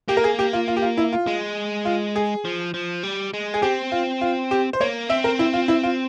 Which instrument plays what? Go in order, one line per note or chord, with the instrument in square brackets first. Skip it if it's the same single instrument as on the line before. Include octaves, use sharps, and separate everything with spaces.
[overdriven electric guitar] A#3 [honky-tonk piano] G4
[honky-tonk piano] A#4
G#4
G4
F4
F4
G4
F4
E4
F4
[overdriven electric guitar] G#3
[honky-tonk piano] F4
G#4
[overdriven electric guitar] F3
F3
G3
G#3
[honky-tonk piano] G#4
[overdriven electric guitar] C4 [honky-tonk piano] G4
[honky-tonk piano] F4
F4
G4
C5
[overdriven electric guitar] A#3 [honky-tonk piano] C#5
[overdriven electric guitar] C4 [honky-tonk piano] E5
[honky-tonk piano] A#4
E4
F4
E4
F4